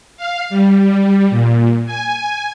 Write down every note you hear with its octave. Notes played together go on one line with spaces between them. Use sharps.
F5
G3
A#2
G#5